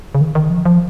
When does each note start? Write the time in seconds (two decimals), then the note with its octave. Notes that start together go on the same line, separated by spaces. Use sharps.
0.15 C#3
0.21 D#3
0.35 D#3
0.50 F3
0.65 F3